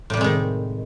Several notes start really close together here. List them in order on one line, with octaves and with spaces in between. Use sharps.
A2 G3 C3 G#3 D#3